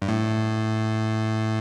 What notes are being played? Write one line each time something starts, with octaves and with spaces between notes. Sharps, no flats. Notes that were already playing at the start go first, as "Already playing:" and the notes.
G2
A2